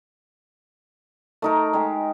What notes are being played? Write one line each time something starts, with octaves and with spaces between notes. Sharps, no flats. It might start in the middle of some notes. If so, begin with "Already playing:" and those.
A3 D#4 A#4
G#3 G4